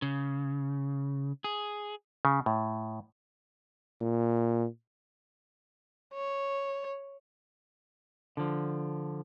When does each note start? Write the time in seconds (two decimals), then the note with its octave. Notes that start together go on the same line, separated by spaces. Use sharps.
0.02 C#3
1.44 G#4
2.25 C#3
2.46 A2
4.01 A#2
6.14 C#5
8.37 D3 F3